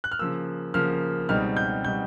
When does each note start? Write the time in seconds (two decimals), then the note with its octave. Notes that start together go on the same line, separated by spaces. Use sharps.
0.04 F#6
0.12 F6
0.19 C#3 F3 A#3 E6
0.74 C#3 F3 A#3 F6
1.29 C#2 B2 G3 C4 D#4 F6
1.57 G6
1.84 B2 G3 C4 D#4 G6